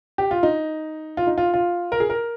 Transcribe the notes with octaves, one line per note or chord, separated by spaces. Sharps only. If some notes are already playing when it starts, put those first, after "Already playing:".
G4
F4
D#4
F4
D#4
F4
F4
A#4
G#4
A#4